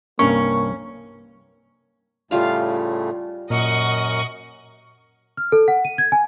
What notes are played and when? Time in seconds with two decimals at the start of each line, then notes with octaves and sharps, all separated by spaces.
0.19 C2 G2 A#3 C#4 A#4 C#6
2.31 A2 C#3 G3 A3 F4 F5
3.50 F#2 A#2 A#4 D#5 F#5 C#6
5.37 F6
5.52 A4
5.68 F#5
5.85 D#7
5.98 G#6
6.12 G#5